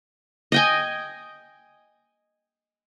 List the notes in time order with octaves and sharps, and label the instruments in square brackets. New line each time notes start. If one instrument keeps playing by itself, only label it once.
[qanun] D#5 G5 G#5